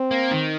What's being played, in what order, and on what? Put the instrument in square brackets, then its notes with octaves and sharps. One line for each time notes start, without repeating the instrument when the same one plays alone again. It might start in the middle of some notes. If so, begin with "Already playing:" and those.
Already playing: [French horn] C4
[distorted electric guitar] A#3
D#3